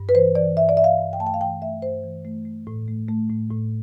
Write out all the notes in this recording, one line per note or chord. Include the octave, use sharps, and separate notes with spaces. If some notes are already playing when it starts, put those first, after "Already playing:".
Already playing: G2
B4
E3 C5
E3 D5
G2 E5
D5
G2 E5
F5
G2
G5
A3 A5
G5
F5
E3 G5
A3 E5
G2 C5
E3
A3
A3
A2
A3
A3
A2
A2